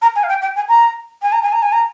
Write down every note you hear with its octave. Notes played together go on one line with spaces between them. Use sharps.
A#5
G#5
F5
G5
G5
G#5
A#5
G#5
A#5
G#5
A#5
G#5
A#5